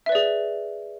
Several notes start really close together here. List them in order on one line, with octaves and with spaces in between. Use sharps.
E5 B4 D5 G#4